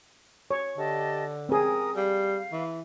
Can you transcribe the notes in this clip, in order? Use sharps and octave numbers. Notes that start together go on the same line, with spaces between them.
C#5
D3 G4 D#5 A5
C4 G#4 A#4 D#6
G3 F5
E3